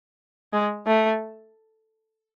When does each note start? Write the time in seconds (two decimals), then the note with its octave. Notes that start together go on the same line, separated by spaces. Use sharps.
0.53 G#3
0.87 A3